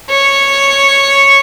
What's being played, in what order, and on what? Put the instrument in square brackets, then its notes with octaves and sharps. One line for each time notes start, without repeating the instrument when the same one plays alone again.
[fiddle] C#5